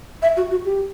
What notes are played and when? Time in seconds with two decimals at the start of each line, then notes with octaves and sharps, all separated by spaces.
0.22 E5
0.37 F#4
0.51 F#4
0.65 G4